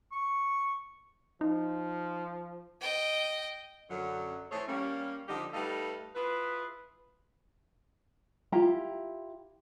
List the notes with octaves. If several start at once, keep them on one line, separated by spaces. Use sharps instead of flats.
C#6
F3 D#4
D#5 G5
F#2 D3 F#3
E3 A3 G#4 A4 C5 C#5
G3 A#3 C#4
D3 F3 D#4 G4
G3 A3 D#4 A4 B4 F5
E4 F4 G#4 B4
E4 F4 G4 A#5